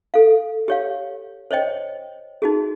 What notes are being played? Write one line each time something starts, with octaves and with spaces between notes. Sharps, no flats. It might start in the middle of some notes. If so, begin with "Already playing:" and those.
A4 F5
G4 C#5 F5
C5 C#5 D#5 G5
D#4 F#4 G#4